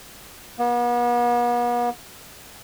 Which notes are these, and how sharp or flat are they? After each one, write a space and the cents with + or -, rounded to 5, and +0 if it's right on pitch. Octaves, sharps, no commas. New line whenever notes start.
B3 -40